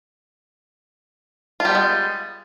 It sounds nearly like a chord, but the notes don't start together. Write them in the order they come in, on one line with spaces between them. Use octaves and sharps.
F4 G3 B3 G#3